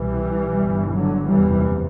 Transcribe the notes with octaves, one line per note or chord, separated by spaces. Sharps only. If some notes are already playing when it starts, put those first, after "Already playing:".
Already playing: C2 B2 E3 G3
G1 G2
D3 F#3
F#1 E2 C3 E3 G3